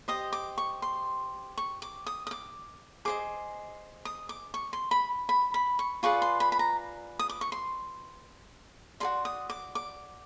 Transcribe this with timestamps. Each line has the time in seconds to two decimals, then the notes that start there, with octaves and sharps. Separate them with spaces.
0.08 G4 C5 D#5 D#6
0.33 D6
0.58 C#6
0.82 C6
1.58 C#6
1.82 D6
2.06 D#6
2.27 D#6
2.31 D6
3.05 G#4 C5 D#5 D6
4.05 D#6
4.29 D6
4.54 C#6
4.73 C6
4.91 B5
5.29 B5
5.54 B5
5.79 C#6
6.03 F4 G#4 B4 D5 C#6
6.22 C6
6.40 B5
6.52 B5
6.59 A#5
7.19 D#6
7.29 D6
7.41 C#6
7.52 C6
9.00 F#4 A4 D5 C6
9.25 D#6
9.50 D6
9.75 D6